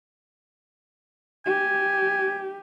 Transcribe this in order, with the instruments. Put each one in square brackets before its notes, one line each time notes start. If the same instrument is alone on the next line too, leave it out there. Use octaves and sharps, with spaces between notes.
[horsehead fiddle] G4 [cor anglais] G#5